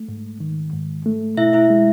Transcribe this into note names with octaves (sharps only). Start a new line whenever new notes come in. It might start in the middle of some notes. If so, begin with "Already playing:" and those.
Already playing: A3
G#2
D#3
G#2
A3
B2 E4 E5
E4 E5
G#3